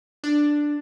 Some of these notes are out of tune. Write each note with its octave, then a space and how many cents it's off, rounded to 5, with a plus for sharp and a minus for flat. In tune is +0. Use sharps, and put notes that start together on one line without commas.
D4 +5